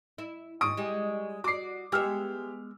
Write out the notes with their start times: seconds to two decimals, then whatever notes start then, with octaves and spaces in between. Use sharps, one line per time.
0.18 E4
0.61 D#2 G#2 C#6 D#6 D7
0.77 G3 G#3
1.44 F#4 D5 D6 C7
1.92 G#3 B3 G4 E5 E6 F6